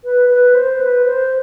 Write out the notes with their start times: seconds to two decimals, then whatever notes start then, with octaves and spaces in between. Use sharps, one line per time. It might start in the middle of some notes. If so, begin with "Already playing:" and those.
0.04 B4
0.29 B4
0.55 C5
0.81 B4
1.05 C5